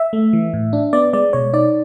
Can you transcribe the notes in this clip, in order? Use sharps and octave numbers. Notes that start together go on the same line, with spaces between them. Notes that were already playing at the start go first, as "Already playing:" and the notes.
Already playing: E5
A3
E3
A2
D4
B3 D5
G#3 D5
B2 C#5
D#4 D5